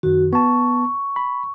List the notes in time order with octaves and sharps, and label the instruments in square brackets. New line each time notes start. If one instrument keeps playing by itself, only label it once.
[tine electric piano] F#2 D#3 [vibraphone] F#4
[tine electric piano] B3 A5 [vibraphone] C#6
[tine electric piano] B5